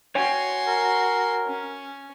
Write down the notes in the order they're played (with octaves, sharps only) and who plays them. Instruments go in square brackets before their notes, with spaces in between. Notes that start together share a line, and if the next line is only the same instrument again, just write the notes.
[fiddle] F#4 C6 [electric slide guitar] C#5 G5 G#5
[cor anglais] A#4
[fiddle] C#4